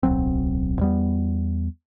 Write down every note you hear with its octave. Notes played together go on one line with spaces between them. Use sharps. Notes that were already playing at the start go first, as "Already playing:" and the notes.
D1 B1 F#3 C4
E2 G3 B3